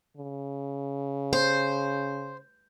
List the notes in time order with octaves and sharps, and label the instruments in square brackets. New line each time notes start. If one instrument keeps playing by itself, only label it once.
[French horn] C#3
[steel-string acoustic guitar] C5